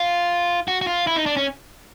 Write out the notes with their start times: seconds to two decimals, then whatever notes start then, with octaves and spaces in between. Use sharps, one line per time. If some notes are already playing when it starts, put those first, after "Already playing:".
Already playing: F4
0.68 F#4
0.82 F#4
0.87 F4
1.07 E4
1.16 D#4
1.26 D4
1.37 C#4